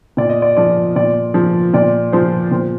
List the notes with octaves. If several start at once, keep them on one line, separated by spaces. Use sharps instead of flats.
A#2 D5
D#5
D5
F3 D5
A#2 D5
F3
A#2 D5
F3 C5
A#2 C5